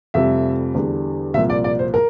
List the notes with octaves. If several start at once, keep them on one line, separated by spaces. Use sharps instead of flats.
F1 F2 C3 G3 E5
E2 D3 G3
C2 A#2 F3 E5
D5
D5
C5
A#4